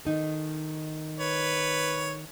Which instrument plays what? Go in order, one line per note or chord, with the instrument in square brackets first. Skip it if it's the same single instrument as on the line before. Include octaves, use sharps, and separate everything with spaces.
[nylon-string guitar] D#3 D#4 A4
[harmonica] B4 C#5